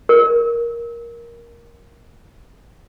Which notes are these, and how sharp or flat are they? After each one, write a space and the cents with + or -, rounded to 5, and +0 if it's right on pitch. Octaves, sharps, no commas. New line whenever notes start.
A#4 +10